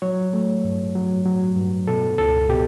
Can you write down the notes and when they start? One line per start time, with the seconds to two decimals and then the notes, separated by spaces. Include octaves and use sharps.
0.02 F#3 C#5
0.33 A3
0.64 G2
0.95 F#3
1.25 F#3
1.56 G2
1.88 B2 A4
2.18 C#2 A4
2.49 B2 G4